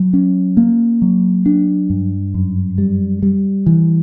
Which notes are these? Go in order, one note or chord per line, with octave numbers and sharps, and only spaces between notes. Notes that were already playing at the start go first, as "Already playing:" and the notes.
Already playing: F#3
C#4
A#3
F#3
D4
G2
F#2
G3
G3
E3